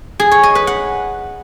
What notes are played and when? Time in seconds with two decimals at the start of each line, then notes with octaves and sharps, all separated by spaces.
0.20 G#4
0.31 C#5
0.43 D#5
0.55 B4
0.67 F#5